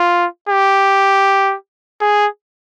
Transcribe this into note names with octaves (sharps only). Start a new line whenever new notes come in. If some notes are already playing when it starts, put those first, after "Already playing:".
Already playing: F4
G4
G#4